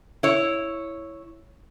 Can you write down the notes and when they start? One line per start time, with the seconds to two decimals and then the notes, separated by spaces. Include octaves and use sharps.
0.23 E4 C#5